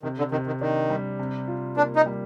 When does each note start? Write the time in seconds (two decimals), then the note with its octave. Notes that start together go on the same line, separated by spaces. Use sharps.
0.03 C3 D#3
0.18 D3
0.32 C3 D#3
0.47 D#3
0.61 D#3 D4
0.90 G3
1.19 C3
1.48 F4
1.77 A#3 D4
1.96 D#4
2.06 G3